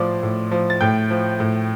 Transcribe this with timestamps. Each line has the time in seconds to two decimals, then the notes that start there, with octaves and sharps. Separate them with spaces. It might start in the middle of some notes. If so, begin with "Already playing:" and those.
Already playing: A2 F3 D5 C6 D6
0.23 A2
0.51 F3
0.70 A6
0.81 A2 G5 G6
1.10 F3
1.40 A2